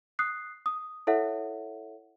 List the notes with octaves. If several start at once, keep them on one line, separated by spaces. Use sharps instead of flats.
D#6 F#6 C7
D#6
E4 A4 C#5 E5 F#5